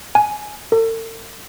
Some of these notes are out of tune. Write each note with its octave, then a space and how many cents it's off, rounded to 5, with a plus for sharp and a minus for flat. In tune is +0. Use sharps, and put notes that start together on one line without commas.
G#5 +15
A4 +45